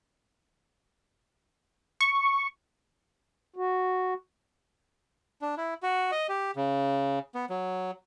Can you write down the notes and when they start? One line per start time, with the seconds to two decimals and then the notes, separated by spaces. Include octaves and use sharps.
2.01 C#6
3.56 F#4
5.42 D4
5.57 E4
5.83 F#4
6.12 D#5
6.29 G4
6.56 C#3
7.35 B3
7.50 F#3